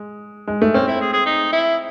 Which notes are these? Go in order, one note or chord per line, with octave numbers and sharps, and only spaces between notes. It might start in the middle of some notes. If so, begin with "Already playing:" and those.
Already playing: G#3
G#3
A3
C4 C#4
E4
G#4
G#4
D#4
E4